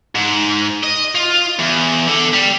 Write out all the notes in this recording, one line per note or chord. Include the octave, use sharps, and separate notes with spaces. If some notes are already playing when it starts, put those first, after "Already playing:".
G#2
D#5
F4
E2
D3
G3